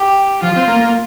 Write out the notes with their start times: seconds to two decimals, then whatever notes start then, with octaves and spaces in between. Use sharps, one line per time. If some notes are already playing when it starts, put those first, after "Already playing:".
Already playing: G4
0.42 F3 F4
0.56 C4
0.68 A#3
0.80 A#3